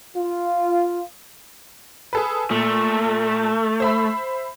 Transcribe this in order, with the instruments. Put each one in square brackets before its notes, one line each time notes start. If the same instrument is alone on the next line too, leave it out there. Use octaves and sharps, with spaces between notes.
[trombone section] F4
[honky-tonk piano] G#4 A4 B4
[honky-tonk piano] A#2 [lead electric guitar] A3
[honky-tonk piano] C5 E5 B5